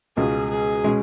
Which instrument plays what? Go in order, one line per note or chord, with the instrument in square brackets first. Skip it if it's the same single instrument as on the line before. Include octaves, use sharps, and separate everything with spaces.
[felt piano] C#2 B2 G#3 C#4 F4 [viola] G#4
[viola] G#4
[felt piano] B2 G#3 C#4